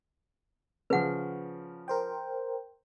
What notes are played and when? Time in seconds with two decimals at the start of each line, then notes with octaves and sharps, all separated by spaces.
0.90 C#3 F3 B4 F#5
1.88 A#4 C5 G5